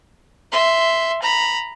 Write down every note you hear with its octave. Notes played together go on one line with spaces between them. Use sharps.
E5 C6
A#5 B5